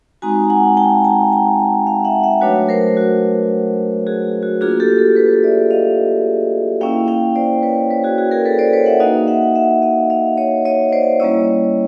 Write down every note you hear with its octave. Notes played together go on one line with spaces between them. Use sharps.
G#3 C4 D#4 F#4 G#5 A#5
F#5 G#5
G5 A5
G#5 A#5
G5 A5
F5 G5
E5 F#5
E5 F#5
F#3 A3 D4 F#4 B4 C#5
A#4 C5
F#4
F#4 G#4
F#4
A#3 D4 F4 F#4 G#4
G4 A4
G4 A4
A4 B4
D5 E5
D#5 F5
A#3 C#4 E4 F5 G5
F5 G5
C5 D5
B4 C#5
B4 C#5
F#4 G#4
F#4 G#4
G#4 A#4
A4 B4
C5 D5
B4 C#5
E5 F#5
A#3 D#4 F#4 D#5 F5
E5 F#5
E5 F#5
D#5 F5
D#5 F5
C#5 D#5
C#5 D#5
C5 D5
G3 A#3 C#4 E4 C#5 D#5